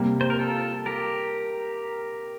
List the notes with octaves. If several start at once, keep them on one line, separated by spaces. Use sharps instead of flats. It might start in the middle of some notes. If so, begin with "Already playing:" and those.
Already playing: C3 G3 A#3
C5
A#4
F4 A4
G4 A#4